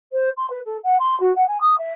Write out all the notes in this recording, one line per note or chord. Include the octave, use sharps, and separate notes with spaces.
C5
C6
B4
A4
F#5
C6
F#4
F#5
G#5
D#6
E5